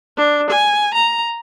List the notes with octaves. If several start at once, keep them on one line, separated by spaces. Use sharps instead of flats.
D4
G#5
A#5